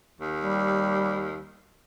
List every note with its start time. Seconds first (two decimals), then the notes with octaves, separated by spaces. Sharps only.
0.21 D#2
0.42 G3